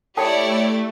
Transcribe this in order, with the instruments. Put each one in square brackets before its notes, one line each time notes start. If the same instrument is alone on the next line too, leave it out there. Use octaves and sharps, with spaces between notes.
[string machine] A3 [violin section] E4 G4 D5 [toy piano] A4 G5 A5 [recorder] C#5